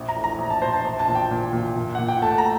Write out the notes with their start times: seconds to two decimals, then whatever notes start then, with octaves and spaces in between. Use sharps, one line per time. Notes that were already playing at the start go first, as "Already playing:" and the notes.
Already playing: A#1
0.08 A#5
0.16 A2
0.24 A#5
0.38 A#1
0.50 A5
0.62 A#1 C5
0.73 A5
0.84 A#1
0.99 A5
1.08 A#2
1.15 G5
1.31 A#2
1.53 A#2
1.76 A#2
1.95 A#2 F#5
2.09 G5
2.22 A3 A5
2.38 A#5